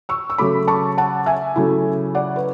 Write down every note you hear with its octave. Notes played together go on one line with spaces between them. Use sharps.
C#6 E6
E6
C#3 F#3 A3 B5 D6
A5 C#6
F#5 A5
E5 G#5
C#3 F#3 A3 E4
D5 F#5
B4